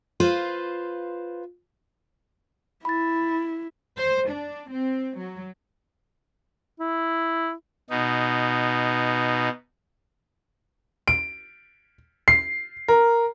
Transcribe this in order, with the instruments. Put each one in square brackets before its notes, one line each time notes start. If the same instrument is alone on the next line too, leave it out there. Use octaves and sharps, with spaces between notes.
[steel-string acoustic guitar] F4 B4 C5 F5
[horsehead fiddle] E4 [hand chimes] B5 A6
[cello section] C5
D4
C4
F#3
[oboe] E4
[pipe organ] B2 D#4
[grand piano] D7
C7
A#4